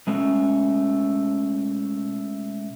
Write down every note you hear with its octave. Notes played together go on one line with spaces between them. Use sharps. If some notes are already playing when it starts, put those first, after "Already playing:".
B2 G#3 A3 C#4